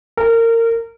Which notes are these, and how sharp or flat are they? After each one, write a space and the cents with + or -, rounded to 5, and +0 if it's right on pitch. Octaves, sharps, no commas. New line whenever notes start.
A#4 -25